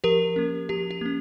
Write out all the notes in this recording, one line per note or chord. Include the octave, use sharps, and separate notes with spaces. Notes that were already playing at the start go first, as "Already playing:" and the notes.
F3 G4 A#4
A#3 C#4
F3 G4
G4
A#3 C#4